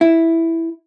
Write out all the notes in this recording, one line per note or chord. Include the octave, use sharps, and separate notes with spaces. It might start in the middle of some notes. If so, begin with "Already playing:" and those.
E4